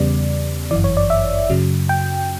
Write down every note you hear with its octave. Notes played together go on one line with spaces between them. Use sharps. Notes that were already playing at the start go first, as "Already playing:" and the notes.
Already playing: E2 C#3 G3 B3 D5
G1 F#2 E3 D5
C#5
D5
E5
F#2 C#3 F#3
G5